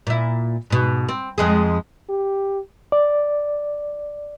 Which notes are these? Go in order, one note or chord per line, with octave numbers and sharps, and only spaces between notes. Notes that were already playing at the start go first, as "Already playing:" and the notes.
A#2 E4
G#2 B2
C4
F2 G#3 G#4
G4
D5